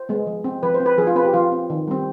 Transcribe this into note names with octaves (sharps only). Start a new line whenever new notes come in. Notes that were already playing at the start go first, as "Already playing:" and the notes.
Already playing: C5
G#3 B3
F3
C4
F3 B4
C5
C4
B4
F3 G#4
F4
C4 B4
G4
F3 F4
C4
D#3
G3 C4